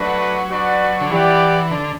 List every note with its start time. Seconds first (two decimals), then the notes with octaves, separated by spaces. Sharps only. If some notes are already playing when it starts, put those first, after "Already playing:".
Already playing: F#3 A3 D4 F#4 B4
0.51 D4 F#4 B4 D5
1.01 D3
1.10 E3 E4 G4 D5 F#5
1.71 D3